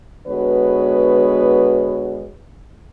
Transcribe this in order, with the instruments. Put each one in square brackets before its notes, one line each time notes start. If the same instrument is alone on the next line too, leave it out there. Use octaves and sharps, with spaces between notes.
[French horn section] D3 G#3 B3 F#4 B4 C#5